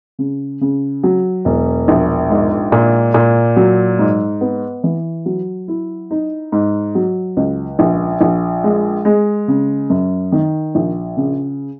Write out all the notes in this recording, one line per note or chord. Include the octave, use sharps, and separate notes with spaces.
C#3
C#3
F#3
E1
A#1
G#2
A#2
A#2
F#3
G#2
B3
E3
F#3
E4
D#4
G#2
F#3
C#2
A#1
A#1
G#3
G#3
C#3
F#2
D#3
A#1
C#3